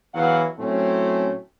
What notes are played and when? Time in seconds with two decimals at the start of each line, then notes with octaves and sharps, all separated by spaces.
0.14 E2 E3 F#3 F5 F#5
0.59 A2 F#3 A3 C4 C#4